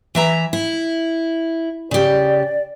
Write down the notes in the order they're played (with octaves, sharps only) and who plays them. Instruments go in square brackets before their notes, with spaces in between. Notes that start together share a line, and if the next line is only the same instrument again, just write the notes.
[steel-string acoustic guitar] E3 E5 A#5
E4
[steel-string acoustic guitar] C#3 G4 [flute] D5